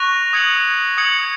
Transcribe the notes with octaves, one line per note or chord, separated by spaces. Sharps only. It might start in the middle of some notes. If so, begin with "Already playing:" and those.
Already playing: C#6 F#6 A#6 F7
D#6 G#6 C#7 F#7
D#6 G#6 C#7 F#7